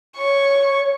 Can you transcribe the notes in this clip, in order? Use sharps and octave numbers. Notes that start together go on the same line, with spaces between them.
C#5 C#6